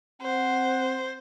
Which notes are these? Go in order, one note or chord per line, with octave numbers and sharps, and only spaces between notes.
C4 C5 F#5